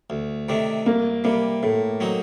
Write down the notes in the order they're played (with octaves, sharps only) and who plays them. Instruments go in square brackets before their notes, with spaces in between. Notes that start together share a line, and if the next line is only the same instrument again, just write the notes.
[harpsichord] D2
C3 D#3 A3 D4
[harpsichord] C2 [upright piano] A#3
[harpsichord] C3 G3 [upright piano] A#3
[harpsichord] A2 [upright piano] A3
[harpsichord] F#3 C4 D#4